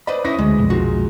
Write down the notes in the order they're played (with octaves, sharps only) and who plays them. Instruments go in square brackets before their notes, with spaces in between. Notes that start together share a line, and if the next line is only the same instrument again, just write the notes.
[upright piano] B4 D5 D#5 [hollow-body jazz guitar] C5 B5
[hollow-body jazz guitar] C#4 D#4 E4 [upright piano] D#6 A#6
[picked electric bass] D2 [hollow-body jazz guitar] G#3
[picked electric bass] B1 F2
[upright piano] A#2 G#3 [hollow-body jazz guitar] F#4